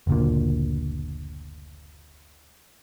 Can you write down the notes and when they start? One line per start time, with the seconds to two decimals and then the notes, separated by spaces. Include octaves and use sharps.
0.07 F#1 D2 A#2